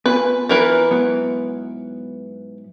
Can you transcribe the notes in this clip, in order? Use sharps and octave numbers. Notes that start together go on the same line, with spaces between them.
B3 F4 B4 G#5
E3 A#4 B4
G#2 F#3 B3